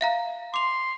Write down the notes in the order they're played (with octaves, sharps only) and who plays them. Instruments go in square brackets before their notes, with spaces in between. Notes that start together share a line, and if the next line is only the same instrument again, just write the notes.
[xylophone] E5 F5 A#5
[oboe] C6 [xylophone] D6 F7